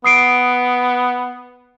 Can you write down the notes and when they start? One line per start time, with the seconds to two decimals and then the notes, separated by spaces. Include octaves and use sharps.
0.04 B3 D#6 C7 D7